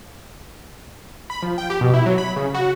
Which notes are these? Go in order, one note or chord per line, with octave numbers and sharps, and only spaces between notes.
B5
F3
G5
G4
B2
E4
F#3
B5
C#3
F#4